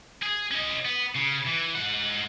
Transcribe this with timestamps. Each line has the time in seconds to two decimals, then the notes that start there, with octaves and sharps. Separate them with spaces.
0.22 G#4
0.51 C#4 D#5
0.85 B3
1.16 C#3
1.47 E3
1.75 G#2 F#5